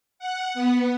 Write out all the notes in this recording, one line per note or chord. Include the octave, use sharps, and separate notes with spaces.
F#5
B3